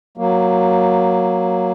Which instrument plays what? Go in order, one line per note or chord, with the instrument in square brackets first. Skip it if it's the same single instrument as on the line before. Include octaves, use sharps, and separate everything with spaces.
[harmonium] F#3 A#3